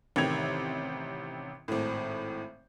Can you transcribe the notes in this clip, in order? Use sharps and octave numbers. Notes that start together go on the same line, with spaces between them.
A1 C3 D#3 G4 G#6 F7
G#1 A2